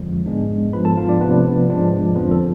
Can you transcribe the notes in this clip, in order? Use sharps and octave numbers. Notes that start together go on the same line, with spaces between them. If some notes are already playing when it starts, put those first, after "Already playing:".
Already playing: F2 D3 F3 G#3
G#2 G#3 B3 D4
G#2 F3 B3 B4 B5
A4 A5
F4 F5
D4 D5
C3 F3 A3 B3 D4 B4
G#2 F3 G#3 D4
F2 D3 F3 B3 B4
A4